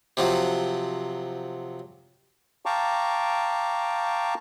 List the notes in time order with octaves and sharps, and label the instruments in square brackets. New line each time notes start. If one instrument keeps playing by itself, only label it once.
[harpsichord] C3 F3 F#3
[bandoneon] F5 G5 A5 A#5 C#6 D6